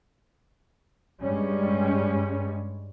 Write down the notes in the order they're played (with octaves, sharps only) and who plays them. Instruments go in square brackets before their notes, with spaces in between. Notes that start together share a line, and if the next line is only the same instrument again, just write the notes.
[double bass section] G2 G3 G#3 C#4